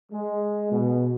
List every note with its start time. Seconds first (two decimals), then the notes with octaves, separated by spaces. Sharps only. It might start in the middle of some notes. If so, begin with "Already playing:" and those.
0.12 G#3
0.72 B2